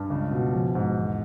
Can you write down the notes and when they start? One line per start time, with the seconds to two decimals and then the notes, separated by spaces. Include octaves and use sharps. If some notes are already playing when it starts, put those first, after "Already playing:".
Already playing: G2
0.10 C#2
0.31 B2
0.53 A#1
0.75 G#2
0.96 E2